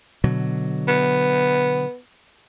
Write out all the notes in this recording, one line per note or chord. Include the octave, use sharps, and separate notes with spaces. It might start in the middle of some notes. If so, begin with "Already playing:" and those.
B2 D3 F#3
B3